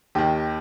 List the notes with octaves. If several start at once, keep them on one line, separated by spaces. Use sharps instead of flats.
D#2 D#3 G4